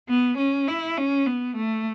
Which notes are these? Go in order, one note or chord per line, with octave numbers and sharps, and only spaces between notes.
B3
C#4
E4
C#4
B3
A3